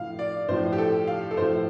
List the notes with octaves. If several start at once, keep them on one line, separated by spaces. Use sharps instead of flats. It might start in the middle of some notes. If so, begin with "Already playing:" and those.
Already playing: A2 F3 F5
D5
A2 F3 C5
G4
A4
F5
A4
A2 F3 C5